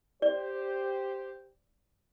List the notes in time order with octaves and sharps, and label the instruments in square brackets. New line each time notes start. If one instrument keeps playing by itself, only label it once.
[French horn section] G4 C5 [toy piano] D5